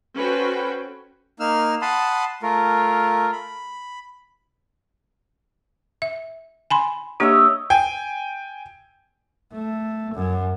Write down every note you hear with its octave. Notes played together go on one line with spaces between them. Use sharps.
C#4 F#4 A4 B4 C5 G5
A#3 D#4 E6 F6
F#5 A5 B5 C6 D#6
A3 F4 A#4
B5
E5
G#5 B5 C6
A#3 D4 G4 C#5 D#5 E5
G5 G#5
A3
F#2